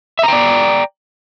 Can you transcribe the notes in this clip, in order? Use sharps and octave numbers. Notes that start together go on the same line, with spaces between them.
D5 E5 G5 A#5